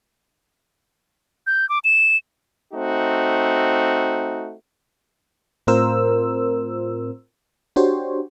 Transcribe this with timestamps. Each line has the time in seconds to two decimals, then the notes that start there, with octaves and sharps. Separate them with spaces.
1.47 G6
1.69 D6
1.84 E7
2.74 A3 C4 D#4 F#4
5.67 A2 C4 F4 A#4 C5 E6
7.76 D4 F#4 G4 C5 C#5